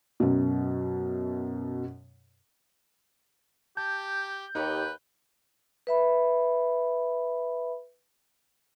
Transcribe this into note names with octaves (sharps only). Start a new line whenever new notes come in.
F#2 B2
G4 A5 G6
D#2 D#4 G4 B4 C#5
B4 E5 B5